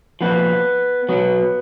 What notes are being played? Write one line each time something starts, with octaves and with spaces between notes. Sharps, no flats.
A#2 F3 B3
B2 F#3 B3